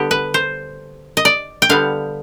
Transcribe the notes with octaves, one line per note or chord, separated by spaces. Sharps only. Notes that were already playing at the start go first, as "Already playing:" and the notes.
Already playing: D3 G3 B3 G4
B4
C5
D#5
D5
G5
D3 G3 B3 F5